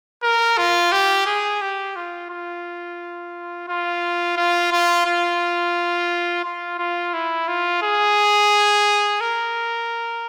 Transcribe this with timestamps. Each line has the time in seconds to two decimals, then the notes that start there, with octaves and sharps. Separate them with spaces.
0.23 A#4
0.58 F4
0.92 G4
1.26 G#4
1.61 G4
1.96 F4
2.30 F4
3.68 F4
4.37 F4
4.72 F4
5.06 F4
6.44 F4
6.79 F4
7.14 E4
7.48 F4
7.83 G#4
9.21 A#4